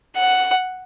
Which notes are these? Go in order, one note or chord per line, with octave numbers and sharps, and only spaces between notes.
F#5